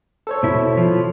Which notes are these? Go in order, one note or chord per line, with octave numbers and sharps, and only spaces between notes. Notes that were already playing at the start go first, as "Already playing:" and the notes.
A4 C5 C#5
B2 E4
F3